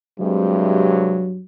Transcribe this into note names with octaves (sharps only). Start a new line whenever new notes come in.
G2 C3 F#3 G#3